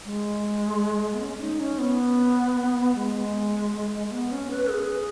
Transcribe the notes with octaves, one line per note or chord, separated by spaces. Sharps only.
G#3
B3
C#4
D#4
C#4
B3
G#3
B3
C#4
B4
G#4